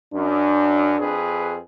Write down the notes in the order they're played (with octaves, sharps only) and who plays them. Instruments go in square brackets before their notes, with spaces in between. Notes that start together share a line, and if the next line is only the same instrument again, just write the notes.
[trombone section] F#2 [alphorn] D4
[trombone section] F2 G#4 B4